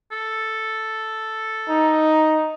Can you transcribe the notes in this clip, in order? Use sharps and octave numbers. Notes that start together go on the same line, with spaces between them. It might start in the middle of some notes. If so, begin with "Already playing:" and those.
A4
D#4